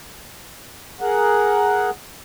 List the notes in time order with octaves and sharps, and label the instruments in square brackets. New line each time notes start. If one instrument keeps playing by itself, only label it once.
[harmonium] G#4 A#4 F#5